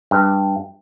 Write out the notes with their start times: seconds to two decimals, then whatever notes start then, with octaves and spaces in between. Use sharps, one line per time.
0.11 G2